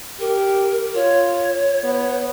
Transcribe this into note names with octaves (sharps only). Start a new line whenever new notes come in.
G4 A#4
F4 C#5
B3